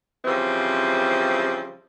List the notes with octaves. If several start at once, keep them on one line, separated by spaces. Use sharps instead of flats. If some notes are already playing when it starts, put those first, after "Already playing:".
C#3 E3 F3 G3 C4